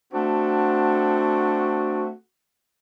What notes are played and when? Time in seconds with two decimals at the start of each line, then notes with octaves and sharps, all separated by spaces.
0.13 A3 C4 D4 F#4